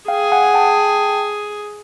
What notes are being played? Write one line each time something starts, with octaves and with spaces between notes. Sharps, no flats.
G#4 F5 G5
F#5 G#5
G5 A5